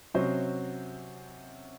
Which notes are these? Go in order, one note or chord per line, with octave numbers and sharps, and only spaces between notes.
C3 F#3 C#4 C5 D#5